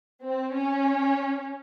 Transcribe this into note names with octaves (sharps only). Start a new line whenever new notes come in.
C4
C#4